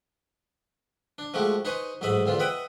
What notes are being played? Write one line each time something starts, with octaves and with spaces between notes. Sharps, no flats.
D4
F3 G#3 A3 F#4 G4
D#4 B4 C5 G#5 A#5 C#6
A1 G#2 F#3 D#5 E5 B5
E2 D3 C4 F4
B4 D#5 E5 F#5 G5